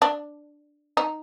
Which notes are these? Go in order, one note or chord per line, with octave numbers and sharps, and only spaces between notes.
D4
D#4